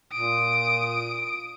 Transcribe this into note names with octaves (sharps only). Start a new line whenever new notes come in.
A#2 D#6 D7